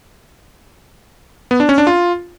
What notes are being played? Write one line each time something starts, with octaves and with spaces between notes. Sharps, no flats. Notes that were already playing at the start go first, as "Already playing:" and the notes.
B3
D4
C#4
D4
F4